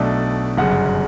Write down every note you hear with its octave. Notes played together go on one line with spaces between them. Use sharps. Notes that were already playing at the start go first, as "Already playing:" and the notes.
Already playing: B1 B2 A3 D4 D5
G1 F#2 C#3 F#5